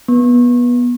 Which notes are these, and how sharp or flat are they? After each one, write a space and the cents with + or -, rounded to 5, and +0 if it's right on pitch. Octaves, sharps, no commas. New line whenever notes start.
B3 -20